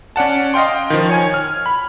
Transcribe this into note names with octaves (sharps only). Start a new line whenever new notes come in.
C#4 D5 F#5 A5
D#5 F5 G5 C6
D#3 F3
C#5 G#5 G#6
F6
B5